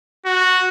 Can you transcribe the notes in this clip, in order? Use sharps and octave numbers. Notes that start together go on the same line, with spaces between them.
F#4